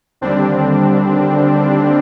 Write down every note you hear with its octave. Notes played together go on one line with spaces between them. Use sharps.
D#2 D3 G3 C4 D4